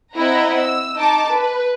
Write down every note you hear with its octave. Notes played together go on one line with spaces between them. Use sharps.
C4 E4 D#5 F#5 A#5
E6
D#4 A5 D6
B4